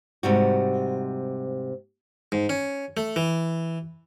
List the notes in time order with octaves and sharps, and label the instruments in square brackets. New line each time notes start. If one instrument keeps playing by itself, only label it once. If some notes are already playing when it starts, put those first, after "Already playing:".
[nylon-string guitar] G#2 C3 G3 F#4
[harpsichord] G#2
C#4
A3
E3